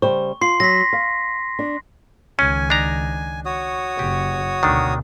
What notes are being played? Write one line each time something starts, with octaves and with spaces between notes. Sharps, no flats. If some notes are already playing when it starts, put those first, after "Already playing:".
C#3 G3 C5 C#6
F4 C6 C7
F#3 A#6 B6
F5
D4
C#2 D#3 C#4 G#5
D4 D#4 A#5
F#4 C#5 D#6
F#1 G4
D2 B2 D#3 D4